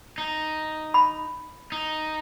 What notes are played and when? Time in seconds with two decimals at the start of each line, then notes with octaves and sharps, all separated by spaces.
0.18 D#4
0.94 B5
1.72 D#4